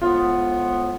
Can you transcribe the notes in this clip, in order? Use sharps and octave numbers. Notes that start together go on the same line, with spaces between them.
A2 F3 G#3 B3 F4